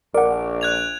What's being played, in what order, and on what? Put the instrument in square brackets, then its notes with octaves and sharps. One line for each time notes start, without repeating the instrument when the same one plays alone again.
[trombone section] A#1 [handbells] A#4 F#5 [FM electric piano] D5
[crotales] F#6 G#6 F7